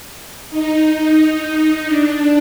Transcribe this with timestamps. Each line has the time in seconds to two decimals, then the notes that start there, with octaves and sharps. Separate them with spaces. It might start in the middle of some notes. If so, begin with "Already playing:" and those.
0.50 D#4
1.86 D4